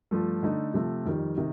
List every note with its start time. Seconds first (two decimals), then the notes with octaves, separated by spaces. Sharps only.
0.11 G2 F3 A3
0.43 D3 A3 D#4
0.74 C3 F3 A3
1.05 F2 D#3 G3
1.37 C3 D#3